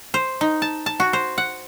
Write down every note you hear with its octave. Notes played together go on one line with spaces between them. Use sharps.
C5
D#4
A5
A5
F#4
C5
F#5